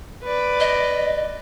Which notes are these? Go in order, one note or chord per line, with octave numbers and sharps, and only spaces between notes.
B4 D5
D#5